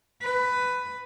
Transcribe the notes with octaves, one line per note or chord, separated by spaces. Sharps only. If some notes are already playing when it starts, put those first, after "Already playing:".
B4